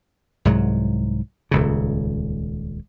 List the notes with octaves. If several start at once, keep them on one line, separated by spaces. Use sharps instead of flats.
C2 G#2 F#3
D#1 C#2 C#3